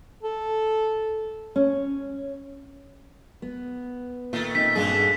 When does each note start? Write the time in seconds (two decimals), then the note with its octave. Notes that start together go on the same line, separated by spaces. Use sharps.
0.23 A4
1.56 C#4
3.42 B3
4.33 A#2 D#3 A3
4.55 C4 C#4 D#4 B6
4.75 G2 B2 D3 G#4 F#5